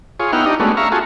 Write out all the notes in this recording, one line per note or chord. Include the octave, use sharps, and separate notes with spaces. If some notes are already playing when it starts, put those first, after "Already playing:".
F4 G#4 C#5
B3 D#4 E4 F#5 G5 F6
D4 D#4 G4 D#5
G#3 A3 B3 C#4 D4 F#4
E5 F5 A#5 C#6
F4 F#4 G#4 A4